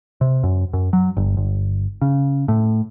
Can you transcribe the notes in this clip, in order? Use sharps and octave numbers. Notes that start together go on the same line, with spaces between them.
C3
F#2
F#2
F#3
G1
G1
C#3
A2